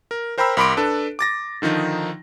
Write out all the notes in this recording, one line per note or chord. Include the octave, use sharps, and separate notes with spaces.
A#4
A#4 C5 G5 A#5 B5 E6
C2 A#4 B5 C6 D6 D7
D4 A4 B4
D6 A6 A#6
D3 D#3 F3 D#4